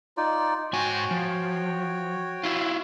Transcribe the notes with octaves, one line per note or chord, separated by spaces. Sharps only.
D#4 F4 D5
G#2 F#4 C#5 G5 G#5
F3
E4 F4